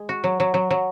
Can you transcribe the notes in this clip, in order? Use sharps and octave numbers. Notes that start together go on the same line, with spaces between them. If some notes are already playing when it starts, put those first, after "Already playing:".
Already playing: G#3
F#4
F#3
F#3
F#3
F#3